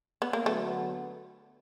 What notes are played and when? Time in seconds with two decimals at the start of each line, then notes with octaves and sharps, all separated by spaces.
0.22 B3
0.33 A#3
0.46 D3 F#3 A3 B3